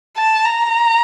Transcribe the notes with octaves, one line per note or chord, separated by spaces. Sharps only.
A5
A#5